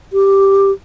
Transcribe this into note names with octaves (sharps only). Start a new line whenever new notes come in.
G4